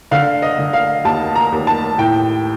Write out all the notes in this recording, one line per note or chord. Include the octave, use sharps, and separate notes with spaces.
D3 F5
D#5
D3
F5
D#2 A5
A#5
D#2
A5
A2 G5